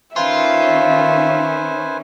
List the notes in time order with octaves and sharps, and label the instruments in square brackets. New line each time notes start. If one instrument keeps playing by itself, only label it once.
[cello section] D#3 C#4 [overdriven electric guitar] F4 [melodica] B4 C5 G#5 [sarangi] E5